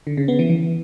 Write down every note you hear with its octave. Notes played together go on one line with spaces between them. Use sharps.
D3
C#3
B3
E3
E3